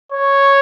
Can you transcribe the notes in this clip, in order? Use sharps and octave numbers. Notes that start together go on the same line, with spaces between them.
C#5